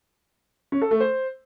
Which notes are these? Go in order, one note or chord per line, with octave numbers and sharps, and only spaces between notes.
C#4
A4
A3
C5